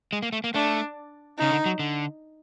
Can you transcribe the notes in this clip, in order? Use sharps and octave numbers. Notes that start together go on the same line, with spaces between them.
G#3
A#3
A3
A#3
A3 D4
C#3 D#4
D3
F#3
D3